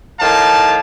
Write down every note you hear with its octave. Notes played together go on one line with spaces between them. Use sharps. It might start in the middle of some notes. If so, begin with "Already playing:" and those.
A2 D#3 F5 A5